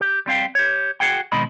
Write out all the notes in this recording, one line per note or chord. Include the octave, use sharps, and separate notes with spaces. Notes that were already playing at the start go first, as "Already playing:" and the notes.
G4
G3 C4 F5 G5
G4 C#5
F#4 G#4 F#5 G5
B2 D#3 G#3 C4 D#5 B5